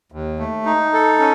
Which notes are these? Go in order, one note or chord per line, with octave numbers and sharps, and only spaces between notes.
D#2
A3
D#4
A4
C#4